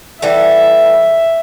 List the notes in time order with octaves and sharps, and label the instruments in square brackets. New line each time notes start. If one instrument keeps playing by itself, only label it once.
[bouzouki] E3 G3 A3 [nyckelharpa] E5